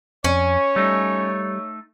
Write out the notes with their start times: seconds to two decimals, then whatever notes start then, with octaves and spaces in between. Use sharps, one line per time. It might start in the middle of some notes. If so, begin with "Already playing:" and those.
0.24 F2 C#4 C#5
0.76 G3 A3 D#4